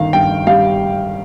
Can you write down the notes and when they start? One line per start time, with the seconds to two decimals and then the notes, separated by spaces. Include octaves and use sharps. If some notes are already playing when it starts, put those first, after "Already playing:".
Already playing: G1 D#3 F5
0.13 G2 G5
0.47 G3 F5